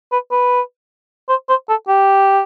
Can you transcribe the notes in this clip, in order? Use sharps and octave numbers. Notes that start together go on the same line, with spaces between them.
B4
B4
C5
C5
A4
G4